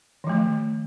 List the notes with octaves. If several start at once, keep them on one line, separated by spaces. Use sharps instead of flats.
D#3 F3 A3